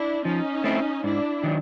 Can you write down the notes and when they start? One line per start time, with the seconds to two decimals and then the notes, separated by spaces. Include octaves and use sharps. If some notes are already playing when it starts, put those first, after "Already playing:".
Already playing: D4 E4
0.25 F3 C#4 D#4
0.64 A3 C4 E4
1.04 G#2 D4 E4
1.44 D#3 F#3